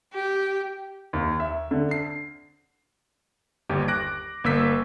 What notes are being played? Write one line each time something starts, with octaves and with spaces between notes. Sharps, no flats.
G4
D#2
E5
D3
C7
G1 D#2 G3 G4
D6 F#6 A#6 D7
G1 A#3 E6 B6